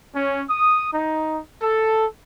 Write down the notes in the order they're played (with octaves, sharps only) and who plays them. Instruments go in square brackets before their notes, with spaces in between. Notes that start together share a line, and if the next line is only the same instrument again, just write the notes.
[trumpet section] C#4
D#6
D#4
A4